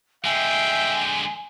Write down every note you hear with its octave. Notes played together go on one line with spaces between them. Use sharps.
D3 G#3 E5 G5 G#5